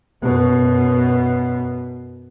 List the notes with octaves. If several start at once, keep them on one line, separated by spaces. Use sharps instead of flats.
F#2 B2